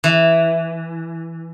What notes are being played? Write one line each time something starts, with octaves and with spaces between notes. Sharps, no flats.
E3